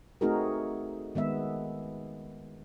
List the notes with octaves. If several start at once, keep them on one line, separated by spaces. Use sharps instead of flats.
A3 C4 D#4 F#4 G#4 A#4
D#3 G#3 B3 E5